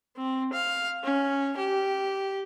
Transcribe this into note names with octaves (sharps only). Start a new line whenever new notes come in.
C4
F5
C#4
G4